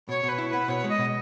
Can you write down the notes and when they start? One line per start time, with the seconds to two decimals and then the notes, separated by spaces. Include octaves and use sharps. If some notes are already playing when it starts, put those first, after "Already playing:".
0.08 B2 C#5
0.23 B2 B4
0.38 E4
0.48 B3 B4
0.68 B2 C#5
0.84 G#3 D#5
0.99 B2